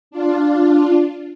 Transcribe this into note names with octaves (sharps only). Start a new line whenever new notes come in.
D4 F4